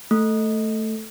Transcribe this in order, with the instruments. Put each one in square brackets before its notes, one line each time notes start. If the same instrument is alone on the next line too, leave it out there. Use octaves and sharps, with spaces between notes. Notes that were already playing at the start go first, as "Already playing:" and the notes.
[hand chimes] A3